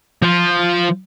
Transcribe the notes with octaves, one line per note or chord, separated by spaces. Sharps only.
F3 F4